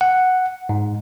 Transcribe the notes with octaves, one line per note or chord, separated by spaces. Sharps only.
F#5
G#2